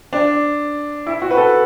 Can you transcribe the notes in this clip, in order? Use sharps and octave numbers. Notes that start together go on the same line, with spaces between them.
D4
E4
F#4
B4
A4